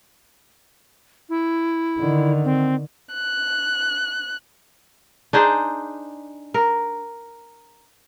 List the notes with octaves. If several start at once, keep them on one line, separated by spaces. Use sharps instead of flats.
E4
D3 D#3
C4
F#6
D4 D#4 G#4 C5
A#4